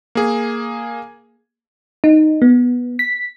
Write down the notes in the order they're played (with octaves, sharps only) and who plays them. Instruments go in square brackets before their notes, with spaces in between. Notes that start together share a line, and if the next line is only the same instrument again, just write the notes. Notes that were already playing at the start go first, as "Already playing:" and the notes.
[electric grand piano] A#3 G#4
[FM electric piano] D#4
B3
B6